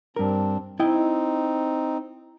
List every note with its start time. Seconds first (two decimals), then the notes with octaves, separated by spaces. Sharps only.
0.16 G2 C4 D4 A#4
0.80 C4 D#4 E4 D#5 G5